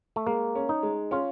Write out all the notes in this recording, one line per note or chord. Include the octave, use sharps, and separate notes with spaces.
A3
G#3 A#3
C#4
D#4
G#3
C#4 F4